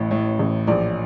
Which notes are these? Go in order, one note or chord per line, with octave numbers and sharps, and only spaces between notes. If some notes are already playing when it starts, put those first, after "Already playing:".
Already playing: A1 A2
A2
A1
A#1 D5